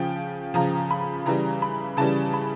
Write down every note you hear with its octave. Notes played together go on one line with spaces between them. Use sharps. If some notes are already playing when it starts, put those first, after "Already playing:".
Already playing: C#3 F3 G5
C#3 F3 A#5
B5
C#3 E3 G3 A#5
B5
C#3 E3 G3 A5
B5